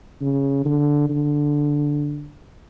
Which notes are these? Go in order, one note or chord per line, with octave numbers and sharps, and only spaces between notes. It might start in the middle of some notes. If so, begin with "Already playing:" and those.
C#3
D3
D3